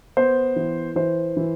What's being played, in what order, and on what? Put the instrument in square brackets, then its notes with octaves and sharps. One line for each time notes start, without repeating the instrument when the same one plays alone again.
[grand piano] B3 C5
E3
E3 C5
E3